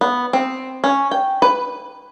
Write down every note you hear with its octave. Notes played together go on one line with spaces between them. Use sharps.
B3
C4
C#4
G5
B4